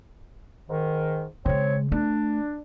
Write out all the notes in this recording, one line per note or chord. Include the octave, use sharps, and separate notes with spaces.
G#2 D#3
C#3 G#3 C4 C#5
A3 D4